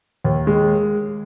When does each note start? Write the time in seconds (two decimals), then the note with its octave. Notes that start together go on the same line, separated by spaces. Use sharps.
0.24 D#2
0.47 G#3